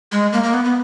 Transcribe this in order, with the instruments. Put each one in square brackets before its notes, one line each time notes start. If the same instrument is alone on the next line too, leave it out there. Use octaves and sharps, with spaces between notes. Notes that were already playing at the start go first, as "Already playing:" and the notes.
[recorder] G#3
A#3
A#3
B3
B3